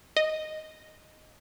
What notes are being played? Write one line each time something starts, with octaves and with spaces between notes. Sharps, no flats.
D#5